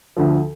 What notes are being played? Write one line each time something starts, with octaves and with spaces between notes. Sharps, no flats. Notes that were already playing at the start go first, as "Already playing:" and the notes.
D2 D3 F3